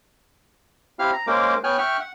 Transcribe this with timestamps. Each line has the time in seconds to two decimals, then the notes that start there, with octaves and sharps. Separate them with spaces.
0.99 C4 E4 G4 F5 F6
1.13 A#5
1.27 G#3 A#3 C#4 A#4 C5 D6
1.64 B3 C#5 G5 G#5 F6 F#6
1.79 E5 G5 C#6 F6 F#6
2.00 F#5